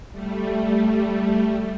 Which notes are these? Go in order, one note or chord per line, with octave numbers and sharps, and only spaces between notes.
G3 A3